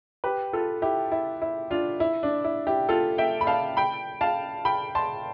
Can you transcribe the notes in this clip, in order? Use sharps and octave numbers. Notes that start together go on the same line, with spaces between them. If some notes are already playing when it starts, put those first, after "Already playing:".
G4 B4
F4 A4
E4 G4
E4
E4
D4 F4
E4
D4
E4
E4 G4
F4 A4
E5 G5
B5
F5 A5
G5 B5
F5 A5
G5 B5
A5 C6